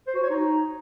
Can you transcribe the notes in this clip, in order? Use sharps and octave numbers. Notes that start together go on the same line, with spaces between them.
C5
F#4
C#5
D#4